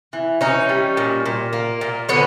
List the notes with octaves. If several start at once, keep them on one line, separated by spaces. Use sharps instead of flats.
E3
E3 C#4 D#4
G3
A#2
A#2
A#3
A#2
D3 B3 C#4